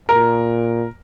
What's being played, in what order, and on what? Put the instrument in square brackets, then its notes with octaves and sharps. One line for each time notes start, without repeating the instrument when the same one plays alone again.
[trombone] A#2 [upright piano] A#4